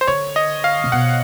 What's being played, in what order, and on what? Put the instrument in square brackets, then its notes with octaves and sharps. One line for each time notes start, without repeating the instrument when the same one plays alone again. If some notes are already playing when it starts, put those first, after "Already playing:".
[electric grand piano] C5
[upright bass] D3 [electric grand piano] C#5
[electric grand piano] D#5
F5
[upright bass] C3
[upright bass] B2 [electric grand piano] F#5